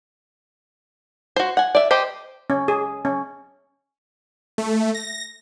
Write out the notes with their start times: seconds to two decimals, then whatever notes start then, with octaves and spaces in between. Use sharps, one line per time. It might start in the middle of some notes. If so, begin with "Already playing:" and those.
1.36 F#4 C5
1.57 F#5 G#5
1.75 D5 E5
1.91 G4 C5 D#5
2.50 C#4
2.68 G#4
3.05 C#4
4.58 A3
4.94 A#6